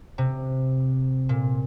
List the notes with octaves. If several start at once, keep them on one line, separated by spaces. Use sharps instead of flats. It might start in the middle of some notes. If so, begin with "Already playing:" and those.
C3
A#2